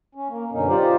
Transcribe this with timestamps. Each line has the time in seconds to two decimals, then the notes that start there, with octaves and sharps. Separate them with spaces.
0.15 C#4
0.29 A#3
0.52 F#2 B2 D3 C#4 D#4
0.68 D#4 F4 G4 C5 D5